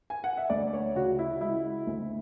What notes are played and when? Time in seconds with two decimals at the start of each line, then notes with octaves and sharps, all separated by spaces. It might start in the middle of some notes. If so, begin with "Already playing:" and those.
0.10 G#5
0.24 F#5
0.37 E5
0.50 D2 D5
0.73 C#5
0.95 C#3 F#4
1.19 E4
1.41 G#3 E4
1.87 D2